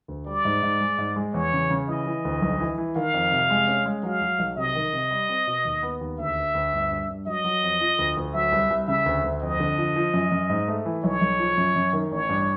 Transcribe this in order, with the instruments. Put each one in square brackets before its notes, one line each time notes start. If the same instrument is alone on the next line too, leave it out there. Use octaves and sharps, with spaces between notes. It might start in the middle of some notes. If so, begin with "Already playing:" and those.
[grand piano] D2
[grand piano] G3 [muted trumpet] D5
[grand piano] G#2
G#2
G#3
G#2
G#3
[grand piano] E2 [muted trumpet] C#5
[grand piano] C#3
C#3
[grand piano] E3 [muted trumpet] D#5
[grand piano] E3
D2
B1
E3
E3
[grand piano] D#3 [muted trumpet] F5
[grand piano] F2
C3
G#3
C#4
G#3
[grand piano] F#3 [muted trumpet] F5
[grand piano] F#3
B1
[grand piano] C3 [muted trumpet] D#5
[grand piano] D#3
C3
G3
C4
B2
D#2
B3
D#2
[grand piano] D2 [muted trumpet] E5
[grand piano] D2
D2
G1
G2
G2
[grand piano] F#3 [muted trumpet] D#5
[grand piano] F#3
F2
F3
D2
D2
[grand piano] F#3 [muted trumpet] E5
[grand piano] C2
C2
[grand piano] C#3 [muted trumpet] E5
[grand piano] D2
D2
[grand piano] F2 [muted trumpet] D#5
[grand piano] D3
F3
F3
F#2
F#2
G#2
A3
E3
[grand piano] B1 [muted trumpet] C#5
[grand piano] B1
F3
F#2
F#2
D#3
[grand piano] A1 [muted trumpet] C#5
[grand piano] G2